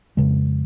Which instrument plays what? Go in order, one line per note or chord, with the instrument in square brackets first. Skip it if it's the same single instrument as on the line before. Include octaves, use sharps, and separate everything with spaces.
[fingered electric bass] F2 C#3 G#3